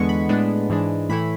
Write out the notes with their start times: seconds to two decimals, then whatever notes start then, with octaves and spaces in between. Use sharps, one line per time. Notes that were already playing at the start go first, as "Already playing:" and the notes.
Already playing: E2 D3 G#3 B3 C#6
0.09 B5
0.29 A2 G#3 B3 D4
0.70 G#2 E3 G#3 D4
1.09 A2 E3 A3 E4 B5